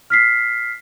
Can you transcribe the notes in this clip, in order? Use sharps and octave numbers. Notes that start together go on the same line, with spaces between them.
F6 B6 C7